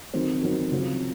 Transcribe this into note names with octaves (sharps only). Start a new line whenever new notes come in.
D#3 F#3 C4
D#3 F#3 C4
C#3 F#3 C4 F4